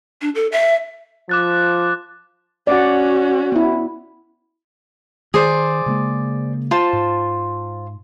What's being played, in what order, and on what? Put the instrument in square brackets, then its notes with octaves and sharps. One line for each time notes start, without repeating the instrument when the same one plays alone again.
[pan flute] D4
A4
E5
[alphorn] F3 [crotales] D6 F#6 A6
[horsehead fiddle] C#4 F#4 [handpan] D5 F#5
[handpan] B3 E4
[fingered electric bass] D#3 [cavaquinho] G#4 C5 D5
[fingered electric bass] C#3 G#3 A#3
[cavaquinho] F4 C5 A5
[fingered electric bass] G#2